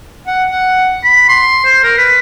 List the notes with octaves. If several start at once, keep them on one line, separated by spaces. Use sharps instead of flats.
F#5
F#5
B5
C6
C5
A#4
B4